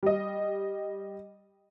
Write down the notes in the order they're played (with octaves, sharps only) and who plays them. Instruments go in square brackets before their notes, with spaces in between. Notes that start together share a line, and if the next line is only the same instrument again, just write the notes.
[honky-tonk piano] G3 D#5